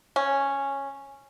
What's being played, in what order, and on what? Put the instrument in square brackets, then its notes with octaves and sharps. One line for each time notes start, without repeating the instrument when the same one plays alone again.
[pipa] C#4